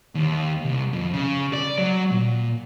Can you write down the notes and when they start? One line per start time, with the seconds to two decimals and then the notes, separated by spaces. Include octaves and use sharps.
0.15 D#2
0.65 C2
0.93 F2
1.13 C#3
1.53 D5
1.78 F#3
2.11 A#2